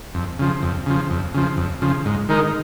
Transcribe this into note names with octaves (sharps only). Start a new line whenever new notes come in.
F2
C#3 F3
F2
C#3 F3
F2
C#3 F3
F2
C#3 F3
G#2
D#3 G#3 D#4 A#4